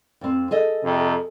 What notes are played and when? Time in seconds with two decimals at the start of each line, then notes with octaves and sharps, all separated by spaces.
0.21 F2 C4
0.51 G#4 A4 D#5
0.83 F2 C3